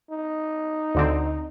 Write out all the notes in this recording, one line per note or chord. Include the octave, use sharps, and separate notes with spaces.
D#4
D2 D3 C4